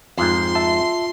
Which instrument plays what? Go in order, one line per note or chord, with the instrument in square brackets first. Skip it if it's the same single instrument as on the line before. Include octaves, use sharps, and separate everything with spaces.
[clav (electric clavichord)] F2 G#2 [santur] F4 [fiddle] C6
[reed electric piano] E5 A5